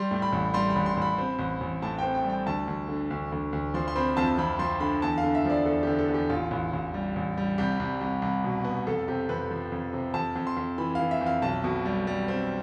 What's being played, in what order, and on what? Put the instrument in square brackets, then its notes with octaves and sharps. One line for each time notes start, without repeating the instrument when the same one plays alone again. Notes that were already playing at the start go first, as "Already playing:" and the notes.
Already playing: [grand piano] G3 C6
A2
B5
A1
G3 C6
B5
A1
C6
A1 B5
C4
A1
A1
A2 A5
C4 G5
G5
G3
G5
D2 A5
D2
D3
D2
D2
D2
F3 C6
C6
C4 B5
F2 A5
F2 B5
F3 C6
D3 B5
E2 A5
F5
D3
E5
F3 D5
E2 A4
D3 G4
A4
E2
G4
A1 F4
A1
A1
G3
A1
G3
C2 G4
C2
C2
C2
B2
B3
F2 A4
C3 G4
F2 B4
F3
F2
C3
F2 A5
F2
C6
F2
E3 B5
E3 F5
E5
F2
F5
B1 A5
B2
G3
G3
C4